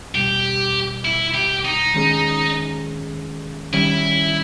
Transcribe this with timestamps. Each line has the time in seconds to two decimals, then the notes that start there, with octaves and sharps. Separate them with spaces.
0.15 E2 B2 G3 G4
1.05 E4
1.34 G4
1.65 D#4
1.95 D#3 G#3 C#4 G#4
3.73 D#3 G3 C#4 E4